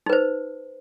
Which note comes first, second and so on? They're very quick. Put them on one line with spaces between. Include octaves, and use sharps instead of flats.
D#4 B4 C5